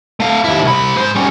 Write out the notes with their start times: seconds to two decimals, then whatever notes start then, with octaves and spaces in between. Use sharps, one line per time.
0.20 A3 F5
0.44 D#2 E4
0.64 C2 B5
0.96 G#2 C5
1.16 G3 C#4